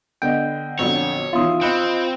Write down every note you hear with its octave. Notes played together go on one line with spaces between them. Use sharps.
D3 B3 D#5 G5
A#1 F2 B2 D3 F#3 C#5
B2 D#3 E3 F4 E5 C6 D#6
C4 D#5 B5 F#6 C#7